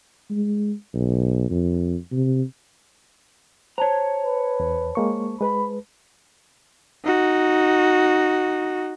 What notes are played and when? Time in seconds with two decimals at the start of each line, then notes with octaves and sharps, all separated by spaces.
0.30 G#3
0.94 B1
1.50 F2
2.12 C3
3.78 C5 C#5 A5 A#5
4.24 B4
4.60 E2
4.95 G#3 A#3 C#6
5.41 G#3 B4 B5
7.04 D#4 F#4